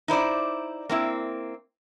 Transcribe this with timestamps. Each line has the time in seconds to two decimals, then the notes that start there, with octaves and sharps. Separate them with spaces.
0.08 D#4 E4 C5 D5
0.89 A#3 C4 E4